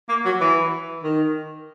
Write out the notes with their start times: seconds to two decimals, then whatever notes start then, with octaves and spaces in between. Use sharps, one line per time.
0.09 A#3
0.25 F#3
0.41 E3
1.03 D#3